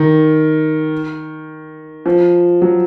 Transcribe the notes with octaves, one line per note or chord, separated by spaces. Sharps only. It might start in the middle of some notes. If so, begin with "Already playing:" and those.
Already playing: D#3
F3
F#3